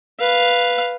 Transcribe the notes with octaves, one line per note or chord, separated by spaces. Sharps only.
B4 F5